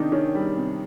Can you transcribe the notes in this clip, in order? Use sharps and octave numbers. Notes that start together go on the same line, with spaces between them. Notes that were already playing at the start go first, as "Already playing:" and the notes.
Already playing: C3 D#3 D4 D#4
D#3 C#4
G3
C3